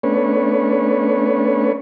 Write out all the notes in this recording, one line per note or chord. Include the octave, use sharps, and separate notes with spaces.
A3 B3 C#4 D4 B4 C#5